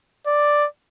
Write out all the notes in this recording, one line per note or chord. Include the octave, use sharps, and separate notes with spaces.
D5